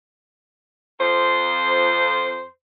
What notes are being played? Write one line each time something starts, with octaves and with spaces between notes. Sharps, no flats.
F2 C5